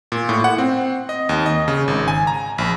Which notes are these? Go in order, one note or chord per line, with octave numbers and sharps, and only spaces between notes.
A#2
A2
F#5
C4
D#5
D#2
D#5
C#3
G#1
G#5
A#5
A#1